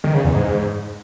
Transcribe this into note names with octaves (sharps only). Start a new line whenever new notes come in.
D#3
C#3
E2
G#2